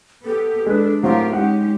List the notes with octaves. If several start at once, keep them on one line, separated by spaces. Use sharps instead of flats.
B3 G4 A4
G#3 D4 B4
A2 F#3 C4 F4 G4 A#4 F5
G#3 C#4 D#4 G4 F#5